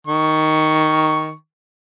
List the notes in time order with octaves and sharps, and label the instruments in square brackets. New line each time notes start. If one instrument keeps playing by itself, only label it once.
[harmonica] D#3 C#6